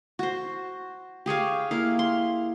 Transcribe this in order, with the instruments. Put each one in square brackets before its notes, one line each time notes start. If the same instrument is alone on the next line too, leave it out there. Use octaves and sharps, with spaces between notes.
[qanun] F#4 C5
G4 G#4 C#5 F5
A#3 E4 F5
C6